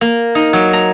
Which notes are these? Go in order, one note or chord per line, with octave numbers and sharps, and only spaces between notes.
A#3
D#4
F#3
A#5